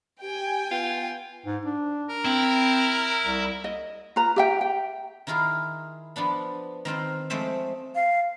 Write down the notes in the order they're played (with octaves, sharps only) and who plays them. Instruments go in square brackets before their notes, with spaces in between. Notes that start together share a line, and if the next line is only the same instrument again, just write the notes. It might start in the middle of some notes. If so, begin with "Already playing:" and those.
[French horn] G4 [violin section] G5 G#5
[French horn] B3 [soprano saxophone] F4
[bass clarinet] G#2
D4
[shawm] A#4
[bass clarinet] C4 [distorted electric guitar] E4
[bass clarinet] C2
[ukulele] D#5
F4 B4 A#5
G4 E5 G5
G5
[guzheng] D#3 E4 F4 G#4 A#4
F3 B3 D4 B5
D#3 C4 F4 C5
F3 G#3 A3 C4 C5 E5
[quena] F5